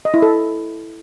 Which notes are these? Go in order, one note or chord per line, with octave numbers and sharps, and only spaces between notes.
D#5
E4
A4